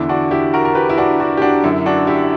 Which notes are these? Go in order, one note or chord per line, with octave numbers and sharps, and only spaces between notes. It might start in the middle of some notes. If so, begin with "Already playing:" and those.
Already playing: E2 D3 E4
D4 F#4
E4 G4
F#4 A#4
A#4
G4 B4
E4
D4 F#4
D4 F#4
G4
D4 F#4
F#2 D3 E4
D4 F#4
E4 G4